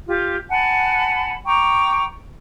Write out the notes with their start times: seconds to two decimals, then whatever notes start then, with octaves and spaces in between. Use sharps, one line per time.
0.07 F4 G4
0.49 F#5 G#5 A5 B5
1.45 G5 A#5 C#6 D6